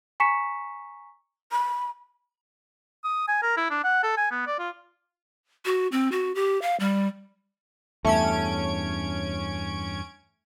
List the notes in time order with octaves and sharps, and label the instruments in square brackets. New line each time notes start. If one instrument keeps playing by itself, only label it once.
[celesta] G#5 A#5 C#6 B6 C#7 E7
[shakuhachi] B5
[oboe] D#6
G#5
A#4
E4
D4
F#5
A4
G#5
B3
D5
F4
[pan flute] F#4
C4
F#4
G4
F5
G3
[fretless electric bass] E2 G2 [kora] A3 E5 [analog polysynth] C#4 G#6 D7